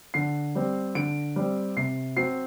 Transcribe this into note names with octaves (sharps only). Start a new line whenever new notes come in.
D3 C7
G3 C4
D3 D7
G3 C4
C3 C7
F#3 C4 C7